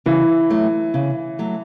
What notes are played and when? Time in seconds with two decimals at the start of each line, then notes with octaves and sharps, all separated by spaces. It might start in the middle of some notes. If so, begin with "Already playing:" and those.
0.06 C#3 E3
0.50 F#3 A3
0.94 C#3
1.39 F#3 A3